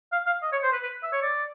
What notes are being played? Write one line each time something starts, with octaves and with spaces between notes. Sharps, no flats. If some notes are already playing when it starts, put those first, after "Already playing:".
F5
F5
D#5
C#5
C5
B4
B4
E5
C#5
D5